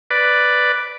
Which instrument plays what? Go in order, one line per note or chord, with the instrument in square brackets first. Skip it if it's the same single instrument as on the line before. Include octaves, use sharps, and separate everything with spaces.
[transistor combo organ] B4 D5